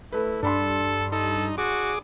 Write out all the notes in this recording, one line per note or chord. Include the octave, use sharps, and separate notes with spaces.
A3 E4 B4
G2 D4 A4 B5 C6
D#4 A4
F#4 G#4 D6